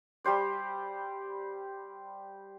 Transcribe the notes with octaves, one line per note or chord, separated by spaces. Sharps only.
G3 G4 C5 D5